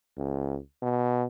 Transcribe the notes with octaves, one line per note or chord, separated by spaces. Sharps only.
C#2
B2